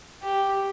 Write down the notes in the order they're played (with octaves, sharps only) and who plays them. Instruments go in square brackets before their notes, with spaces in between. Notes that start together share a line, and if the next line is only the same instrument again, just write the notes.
[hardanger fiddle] G4